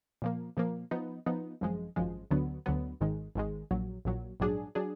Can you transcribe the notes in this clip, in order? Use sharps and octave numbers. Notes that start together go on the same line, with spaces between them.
A#2 F3 A#3
A#2 F3 A#3
F3 B3 D#4
F3 B3 D#4
G#1 F#2 F3 G#3
G#1 F#2 F3 G#3
D2 D3 F#3 B3
D2 D3 F#3 B3
G#1 G#2 D#3 G#3
G#1 G#2 D#3 G#3
A#1 A#2 F#3
A#1 A#2 F#3
A#1 G#2 F#3 D4 G#4
F#3 D4 G#4